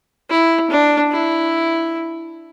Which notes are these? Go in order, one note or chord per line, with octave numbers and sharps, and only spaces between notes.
E4
D4
E4